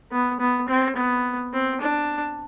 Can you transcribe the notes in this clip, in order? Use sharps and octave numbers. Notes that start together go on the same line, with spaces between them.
B3
B3
C4
B3
C4
D4